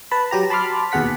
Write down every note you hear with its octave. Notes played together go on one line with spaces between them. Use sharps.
B4 A5 B5
F#3 G4 A#5
A5 B5 C6 D6 F6
D#2 B2 G#4 F#5 B6